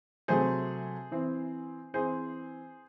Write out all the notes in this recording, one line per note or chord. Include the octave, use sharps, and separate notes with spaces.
C3 F#3 A3 G#4 C5
E3 C4
E3 C4 G#4 C5